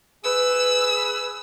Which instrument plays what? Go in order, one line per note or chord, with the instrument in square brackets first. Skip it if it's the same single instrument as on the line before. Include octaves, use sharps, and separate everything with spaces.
[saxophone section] G#4 B4 [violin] E6